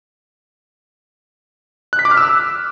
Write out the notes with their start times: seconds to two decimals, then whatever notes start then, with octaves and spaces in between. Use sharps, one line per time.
1.93 F#6
1.99 B6
2.05 D6
2.11 F6
2.17 E6